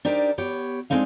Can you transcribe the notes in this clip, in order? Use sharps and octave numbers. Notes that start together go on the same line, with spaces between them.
D4 D#4 G4 A#4 C5 D5
B3 G4 C#5
G#3 A3 C4 D4 D#4 F5